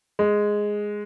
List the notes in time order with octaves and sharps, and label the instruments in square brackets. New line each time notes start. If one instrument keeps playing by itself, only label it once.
[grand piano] G#3